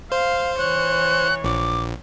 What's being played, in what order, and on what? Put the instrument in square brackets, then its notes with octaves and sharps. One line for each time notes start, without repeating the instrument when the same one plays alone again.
[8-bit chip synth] C5 [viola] F5
[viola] E3 C#5 [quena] F#6
[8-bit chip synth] A#1 [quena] D6